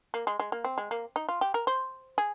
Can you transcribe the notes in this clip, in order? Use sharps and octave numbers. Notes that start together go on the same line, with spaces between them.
A#3
G#3
G#3
A#3
C4
G#3
A#3
D#4
F4
G4
A#4
C5
G#4